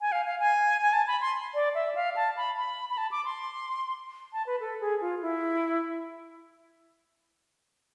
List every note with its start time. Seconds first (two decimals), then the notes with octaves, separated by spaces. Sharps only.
0.01 G#5
0.12 F5
0.26 F5
0.40 G#5
0.82 G#5
0.93 A5
1.07 B5
1.21 C6
1.55 D5
1.75 E5
1.95 F5
2.16 A5
2.37 B5
2.57 B5
2.90 B5
2.97 A5
3.11 D6
3.25 C6
4.33 A5
4.47 B4
4.60 A4
4.81 G#4
5.01 F4
5.22 E4